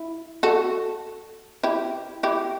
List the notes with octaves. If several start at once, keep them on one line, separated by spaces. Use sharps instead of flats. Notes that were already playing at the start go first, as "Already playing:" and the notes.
Already playing: E4
F#4 A4
E4 G4
E4 G4